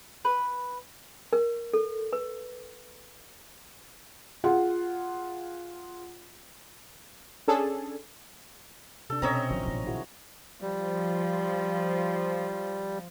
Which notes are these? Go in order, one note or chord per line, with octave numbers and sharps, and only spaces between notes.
B4
A#4
A4
B4
F4 G#4 F#5
C#4 D4 G#4 A4
C3 D4 A4
B2 C4 C#4 C#5 D#5 E5 A#5
G#1 D#3 F3 F#3
A1 A#2
E4 F#4 G#4
F3 G3